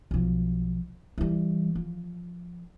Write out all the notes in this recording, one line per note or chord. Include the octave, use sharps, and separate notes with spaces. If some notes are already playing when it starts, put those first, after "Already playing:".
B1 F3
E3 G3
F3